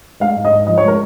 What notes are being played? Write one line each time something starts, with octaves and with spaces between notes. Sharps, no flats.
G#3 F5
G#2
D#5
G#2
F3 D#5
C#5
G#3 A#4